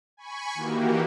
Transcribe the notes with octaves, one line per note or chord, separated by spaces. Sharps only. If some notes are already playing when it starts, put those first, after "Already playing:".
G#5 B5 C#6
D#3 E3 A#3 F#4 G4